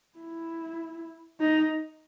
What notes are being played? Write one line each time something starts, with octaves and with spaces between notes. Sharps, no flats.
E4
D#4